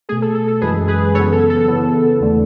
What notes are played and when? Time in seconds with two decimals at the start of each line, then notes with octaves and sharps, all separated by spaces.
0.09 B2 A3 G#4
0.22 A4
0.35 A4
0.48 A4
0.61 F#2 E3 G#3 G#4 B4
0.88 G#4 B4
1.15 F#2 C#3 E3 B3 A4 C#5
1.32 A4
1.50 A4
1.68 C#3 E3 B3 A4
2.20 E2 D3 A3